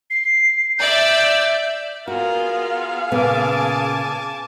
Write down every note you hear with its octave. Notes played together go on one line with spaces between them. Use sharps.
C7
D5 E5 G6
B3 F4 F#4 G#4 A#4 F5
A#2 C#3 B3 G#4 G#5 A5 D6